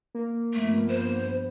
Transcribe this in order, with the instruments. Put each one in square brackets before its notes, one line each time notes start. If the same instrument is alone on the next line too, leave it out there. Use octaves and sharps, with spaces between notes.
[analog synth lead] A#3
[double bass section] G2 F3 B3 [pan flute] A3
[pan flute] C5